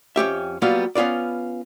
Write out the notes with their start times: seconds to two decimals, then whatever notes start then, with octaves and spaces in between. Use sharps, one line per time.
0.16 F2 C#4 G4 E5
0.62 F#3 G3 A#3 B3 F4 F5
0.95 B3 C#4 F4 B4 D5